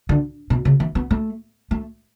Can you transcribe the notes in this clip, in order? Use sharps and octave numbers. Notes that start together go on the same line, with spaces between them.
D3
B2
C#3
E3
B3
A3
A3